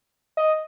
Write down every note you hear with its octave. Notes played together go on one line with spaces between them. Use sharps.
D#5